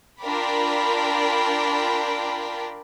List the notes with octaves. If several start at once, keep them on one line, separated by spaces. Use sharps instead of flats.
D4 F4 A#4 D5 G5 B5